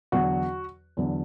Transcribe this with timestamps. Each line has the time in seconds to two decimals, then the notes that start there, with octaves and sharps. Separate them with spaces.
0.12 E2 D3 F#3 F#4
0.97 E2 D3 F#3